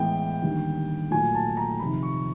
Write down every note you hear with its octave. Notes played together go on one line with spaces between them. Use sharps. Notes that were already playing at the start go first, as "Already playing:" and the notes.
Already playing: A2 E3 G#3 B3 G5
D#2 D3 G3
A#2 F#3 A3 G#5
A5
A#5
F2 C3 D#3 B5
C#6